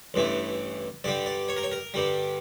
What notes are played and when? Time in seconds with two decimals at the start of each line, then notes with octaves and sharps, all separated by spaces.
0.14 A1 G2 E3 A3
1.04 G2 D3 G3 D5
1.26 D5
1.49 C#5
1.57 A#4
1.63 C#5
1.72 A#4
1.94 G2 D3 G3